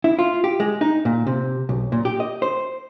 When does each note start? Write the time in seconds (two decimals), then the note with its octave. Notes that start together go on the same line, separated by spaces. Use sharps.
0.04 E4
0.19 F4
0.44 G4
0.60 G#3
0.81 D#4
1.05 A#2
1.27 C3
1.69 B1
1.92 A#2
2.05 G4
2.20 D#5
2.42 C5